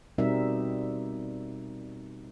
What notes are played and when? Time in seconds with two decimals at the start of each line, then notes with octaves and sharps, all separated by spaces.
0.18 B2 G3 C4 D#4 A#4 E5